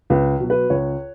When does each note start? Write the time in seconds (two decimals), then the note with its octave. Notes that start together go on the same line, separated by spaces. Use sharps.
0.10 C#2 B4
0.40 B2 F#3
0.50 B4
0.70 C#2 C#5